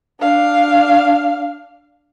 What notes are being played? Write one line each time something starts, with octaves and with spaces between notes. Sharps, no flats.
D4 F5